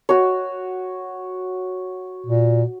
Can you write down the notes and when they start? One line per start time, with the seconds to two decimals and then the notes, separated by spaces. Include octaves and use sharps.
0.09 F#4 C#5
2.26 A#2